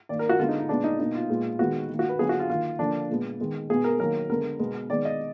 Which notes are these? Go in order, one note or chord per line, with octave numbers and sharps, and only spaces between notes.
D#3 A#3 D5
A#4
F#4
D3 G#3 B3 F4
D#4
D#4
A#2 G#3 B3 D4
D#4
B2 A#3 D#4
F4
A#2 G#3 B3
D#3 G#3 B3 F#4
D#3 A#3
F#4
B4
D3 F#3 B3 G#4
F#4
F4
D#3 A#3 F4
D3 F3 A#3 D4
A#2 G#3 B3
D#3 G#3 B3
B2 G#3 B3 G#4
A#4
D#3 F#3 A#3 A#4
D3 G#3 B3 A#4
B2 G#3 B3
D#3 G#3 B3 D5
D#5